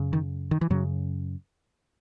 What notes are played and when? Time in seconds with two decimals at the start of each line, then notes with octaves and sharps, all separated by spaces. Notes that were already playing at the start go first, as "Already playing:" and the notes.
Already playing: F#2 C#3
0.13 D#3
0.51 D#3
0.61 E3
0.70 F#2 C#3 F#3